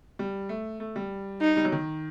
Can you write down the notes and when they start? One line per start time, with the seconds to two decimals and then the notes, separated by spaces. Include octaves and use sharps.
0.19 G3
0.49 A3
0.80 A3
0.96 G3
1.41 D#4
1.57 G3
1.65 F#3
1.72 D#3